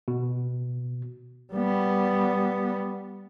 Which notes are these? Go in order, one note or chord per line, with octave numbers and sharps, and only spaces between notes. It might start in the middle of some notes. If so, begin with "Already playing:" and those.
B2
G3 B3